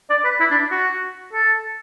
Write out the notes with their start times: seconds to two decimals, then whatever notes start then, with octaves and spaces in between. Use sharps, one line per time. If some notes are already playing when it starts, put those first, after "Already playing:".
0.10 D5
0.25 B4
0.40 E4
0.51 D4
0.71 F#4
1.33 A4